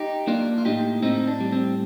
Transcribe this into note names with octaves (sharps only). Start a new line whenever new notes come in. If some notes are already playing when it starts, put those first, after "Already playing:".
Already playing: D#4 G4
A#3 D4 F4
F4
A2 D#4 G4
A2 C4 D#4
D4
G3
C4